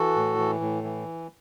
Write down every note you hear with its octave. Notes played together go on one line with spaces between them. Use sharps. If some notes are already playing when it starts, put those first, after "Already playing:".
Already playing: E3 F#4 A4
A2
E3
A2
E3